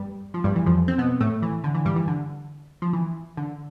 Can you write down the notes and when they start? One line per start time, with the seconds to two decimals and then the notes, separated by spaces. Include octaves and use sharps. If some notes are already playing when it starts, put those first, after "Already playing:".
Already playing: G2 G3
0.34 F3
0.44 G2 G3
0.56 E3
0.66 F2 F3
0.88 C4
0.98 B2 B3
1.21 A2 A3
1.42 E3
1.64 D3
1.75 E3
1.85 G2 G3
1.96 E3
2.08 D3
2.82 F3
2.93 E3
3.37 D3